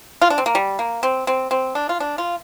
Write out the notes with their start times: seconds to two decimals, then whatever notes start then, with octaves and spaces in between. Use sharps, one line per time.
0.22 F4
0.30 D4
0.38 C4
0.46 A#3
0.55 G3
0.79 A#3
1.03 C4
1.27 C4
1.51 C4
1.75 D4
1.89 F4
2.00 D4
2.18 F4